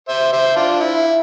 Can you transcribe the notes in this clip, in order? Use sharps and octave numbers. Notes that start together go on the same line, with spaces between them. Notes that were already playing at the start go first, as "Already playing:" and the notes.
C5 E5
C5 E5
D4 F4
E4